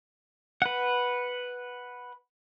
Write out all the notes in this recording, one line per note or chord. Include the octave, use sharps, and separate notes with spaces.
B4 F#5